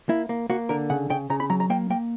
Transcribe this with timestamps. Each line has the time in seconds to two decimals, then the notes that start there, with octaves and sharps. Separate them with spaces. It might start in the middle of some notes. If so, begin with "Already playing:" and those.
0.09 A#3 E4
0.29 A#3
0.50 A#3 F#4
0.69 D3 A#4
0.90 C#3 F#5
1.10 C#3 G5
1.30 C#3 A#5
1.40 B5
1.50 F#3 A#5
1.60 A#5
1.70 A#3 G5
1.90 A#3 G5